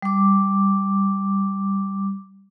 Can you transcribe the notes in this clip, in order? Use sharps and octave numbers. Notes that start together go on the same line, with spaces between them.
G3 D6